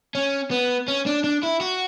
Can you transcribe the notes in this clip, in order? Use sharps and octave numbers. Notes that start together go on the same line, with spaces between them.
C#4
B3
C#4
D4
D4
E4
F#4